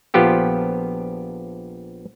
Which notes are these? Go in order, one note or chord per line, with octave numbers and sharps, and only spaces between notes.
A#1 F3 B3 F4 G4 A4